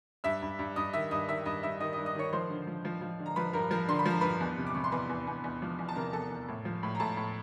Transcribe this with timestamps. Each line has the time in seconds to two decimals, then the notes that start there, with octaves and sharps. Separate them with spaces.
0.24 G2 E5 E6
0.42 G2
0.59 G2
0.76 G2 D#5 D#6
0.93 D#3 E5 E6
1.11 G2 D#5 D#6
1.28 D#3 E5 E6
1.46 G2 D#5 D#6
1.63 G2 E5 E6
1.80 D#3 D#5 D#6
1.93 D#5 D#6
1.98 G2
2.06 D#5 D#6
2.15 D#3 C#5 C#6
2.33 F3 C5 C6
2.50 D3
2.67 F3
2.85 F3
3.02 F3
3.19 D3
3.26 A#5
3.36 F3 B4 B5
3.53 G2 A#4 A#5
3.71 F3 A#4 A#5
3.88 D3 C6
3.99 B5
4.05 F3 A#5
4.21 G2 B4 B5
4.41 E2
4.57 C3
4.66 D6
4.74 C3 C#6
4.84 C6
4.92 E2 B4 B5
5.09 E2
5.27 E2
5.44 E2
5.62 F3
5.79 E2
5.89 A5
5.96 C3 A#4 A#5
6.13 E2 A4 A5
6.31 E2
6.48 A2
6.65 F3
6.83 A2
6.95 A#5
7.00 A2 A4 A5
7.17 A2